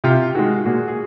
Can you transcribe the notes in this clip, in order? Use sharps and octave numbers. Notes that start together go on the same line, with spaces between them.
C3 F4 G4
D#3 G#3 F#4 G#4
A#2 F#4 G#4
G#4